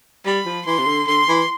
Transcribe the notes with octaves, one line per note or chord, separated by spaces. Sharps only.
G3 B5
F3
E3 C6
C3
D3
D3 C6
E3